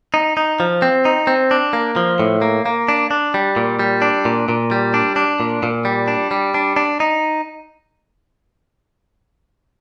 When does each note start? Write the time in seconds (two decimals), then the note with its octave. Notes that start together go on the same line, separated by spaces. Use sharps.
0.14 D#4
0.37 D#4
0.60 F3
0.82 C4
1.05 D#4
1.27 C4
1.51 D4
1.73 A#3
1.96 F3
2.20 A2
2.42 A#3
2.66 A#3
2.89 D4
3.11 D4
3.34 G3
3.56 A#2
3.79 G3
4.02 D4
4.25 A#2
4.49 A#2
4.71 G3
4.94 D4
5.16 D4
5.40 A#2
5.63 A#2
5.85 G3
6.08 D4
6.31 G3
6.54 D4
6.76 D4
7.00 D#4